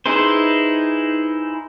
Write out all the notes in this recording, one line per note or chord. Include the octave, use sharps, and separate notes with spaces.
D#4 E4 G#4 B4 C5